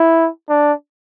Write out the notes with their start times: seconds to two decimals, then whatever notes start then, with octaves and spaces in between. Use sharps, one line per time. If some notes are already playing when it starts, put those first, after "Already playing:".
Already playing: E4
0.49 D4